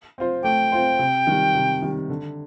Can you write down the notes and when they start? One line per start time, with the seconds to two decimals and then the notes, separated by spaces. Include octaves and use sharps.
0.18 C4 F4 C5
0.44 A3 G5
0.72 C4 F4 C5
0.99 C3
1.27 D#3 G3
1.55 C3
1.82 D#3 G3
2.09 D3